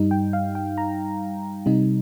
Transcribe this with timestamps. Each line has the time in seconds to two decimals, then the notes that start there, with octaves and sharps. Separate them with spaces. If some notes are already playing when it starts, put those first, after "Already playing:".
Already playing: G2 G3 D#4
0.11 G5
0.33 F5
0.55 G5
0.78 A#5
1.66 C3 G3 D#4